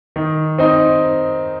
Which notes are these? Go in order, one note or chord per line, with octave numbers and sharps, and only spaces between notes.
D#3
C4 D#4